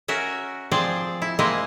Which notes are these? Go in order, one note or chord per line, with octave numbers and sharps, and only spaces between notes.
C#4 F#4 A#4 E5
F3 C4 G#4 D5 G5
E4
G#3 A#3 C4 E4 D#5